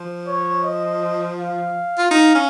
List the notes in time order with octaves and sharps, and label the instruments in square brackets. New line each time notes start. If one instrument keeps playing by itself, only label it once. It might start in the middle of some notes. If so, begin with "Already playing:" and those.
Already playing: [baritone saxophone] F3
[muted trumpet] C#5
D#5
F5
[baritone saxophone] F4
D#4
C#4